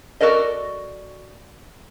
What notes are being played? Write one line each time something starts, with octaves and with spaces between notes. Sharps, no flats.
F#4 A4 A#4 D5 D#5